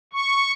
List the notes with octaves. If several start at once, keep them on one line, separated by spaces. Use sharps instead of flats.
C#6